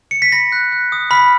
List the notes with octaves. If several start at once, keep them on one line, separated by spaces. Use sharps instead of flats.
C#7
B6
B5 A#6
F#6
F#6
D#6
B5 F6 B6